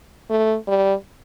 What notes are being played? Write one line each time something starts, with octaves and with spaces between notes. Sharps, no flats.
A3
G3